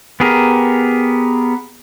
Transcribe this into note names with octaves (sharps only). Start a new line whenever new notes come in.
B3 G4 G#4 A#4